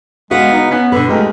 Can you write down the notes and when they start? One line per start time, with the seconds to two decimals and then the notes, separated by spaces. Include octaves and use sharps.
0.31 C#3 G#3 B3 F#4 E5 F5
0.52 D#4 B4
0.71 B3 C#4 F#6 B6
0.92 B2 D3 B4
1.09 D#2 G#3 A3 D#4 F4 G4